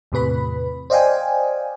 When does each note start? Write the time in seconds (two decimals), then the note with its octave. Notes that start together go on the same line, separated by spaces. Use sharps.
0.12 E2 A2 C3 B4 B5
0.90 C5 D5 D#5 F5 G5 G#5